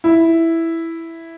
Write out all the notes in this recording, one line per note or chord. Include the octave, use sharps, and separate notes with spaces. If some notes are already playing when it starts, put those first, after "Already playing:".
E4